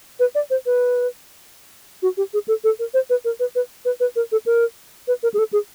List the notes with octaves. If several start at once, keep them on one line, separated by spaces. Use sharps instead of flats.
B4
D5
C5
B4
F#4
G4
G#4
A4
A4
A#4
C5
B4
A#4
B4
B4
B4
B4
A#4
A4
A#4
B4
A#4
G#4
A4
G#4